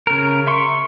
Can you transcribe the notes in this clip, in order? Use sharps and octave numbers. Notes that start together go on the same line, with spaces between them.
C#3 A#4
E5 C6 C#6